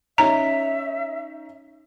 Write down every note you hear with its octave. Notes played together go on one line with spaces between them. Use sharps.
C#4 D#4 C#5 E5 A#5